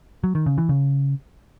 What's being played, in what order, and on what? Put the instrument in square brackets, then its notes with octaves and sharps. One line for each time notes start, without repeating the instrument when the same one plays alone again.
[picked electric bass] F#3
D#3
C#3
E3
C#3